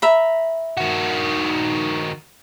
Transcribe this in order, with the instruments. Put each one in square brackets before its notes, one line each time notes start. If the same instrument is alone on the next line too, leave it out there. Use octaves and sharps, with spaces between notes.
[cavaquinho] E5 A#5 B5
[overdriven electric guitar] D#3 F#4